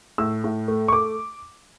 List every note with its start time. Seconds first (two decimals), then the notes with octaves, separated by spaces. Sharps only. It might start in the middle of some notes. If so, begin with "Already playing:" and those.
0.18 A2 E6
0.44 A2
0.68 A3
0.88 C#6
0.92 A3 D6